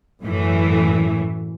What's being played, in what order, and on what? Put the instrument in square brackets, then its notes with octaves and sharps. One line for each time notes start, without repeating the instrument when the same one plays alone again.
[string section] F#2 A2 E3 A3